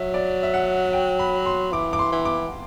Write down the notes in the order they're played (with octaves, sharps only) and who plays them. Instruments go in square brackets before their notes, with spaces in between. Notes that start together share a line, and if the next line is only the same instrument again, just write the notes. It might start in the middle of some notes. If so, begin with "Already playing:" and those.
Already playing: [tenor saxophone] F#3 [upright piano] E5
[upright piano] D5
E5
F#5
G5
B5
C6
[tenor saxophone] E3 [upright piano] D6
[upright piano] D6
C6
[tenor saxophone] E3
[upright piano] D6